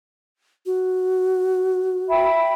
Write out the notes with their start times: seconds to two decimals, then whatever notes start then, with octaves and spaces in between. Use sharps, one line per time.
0.66 F#4
2.09 E5 G5 B5